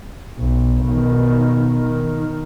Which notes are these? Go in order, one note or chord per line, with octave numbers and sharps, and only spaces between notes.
B1
B2 D#3
D#3